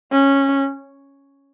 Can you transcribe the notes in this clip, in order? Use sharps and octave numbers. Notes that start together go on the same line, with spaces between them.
C#4